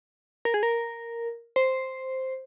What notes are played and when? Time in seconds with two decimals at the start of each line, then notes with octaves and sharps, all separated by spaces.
0.45 A#4
0.54 G#4
0.63 A#4
1.56 C5